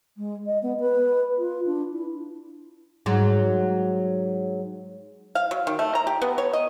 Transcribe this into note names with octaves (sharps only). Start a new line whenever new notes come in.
G#3
D#5
B3
B4
F4
D4
E4
G#2 F#3
F5
F#3
D#3
A3
A#5
G4
B3
C#5
D#5